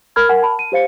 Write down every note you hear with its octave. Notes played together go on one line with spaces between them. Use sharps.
A#4 B5 F6 G#6
A#4 F#5 G#5
A5 B5
D#7
G4 C5 F5 C#7